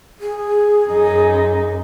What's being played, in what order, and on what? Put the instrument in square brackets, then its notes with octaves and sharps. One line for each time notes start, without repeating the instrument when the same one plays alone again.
[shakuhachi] G#4
[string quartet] F#2 D#4